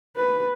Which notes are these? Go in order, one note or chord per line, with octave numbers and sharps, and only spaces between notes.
B4